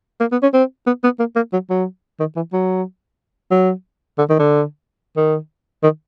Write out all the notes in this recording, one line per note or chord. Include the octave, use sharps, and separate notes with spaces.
A#3
B3
C#4
C4
B3
B3
A#3
A#3
F#3
F#3
D#3
E3
F#3
F#3
D3
D#3
D3
D#3
D#3